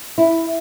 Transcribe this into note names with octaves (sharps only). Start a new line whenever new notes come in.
E4